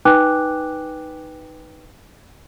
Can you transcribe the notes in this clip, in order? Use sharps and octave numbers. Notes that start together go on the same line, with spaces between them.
D#4 B4 G5 G#5 D6 F#6